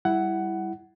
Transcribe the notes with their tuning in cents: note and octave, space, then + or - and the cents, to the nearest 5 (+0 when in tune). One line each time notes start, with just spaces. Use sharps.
G3 +0 E4 +0 F#5 +15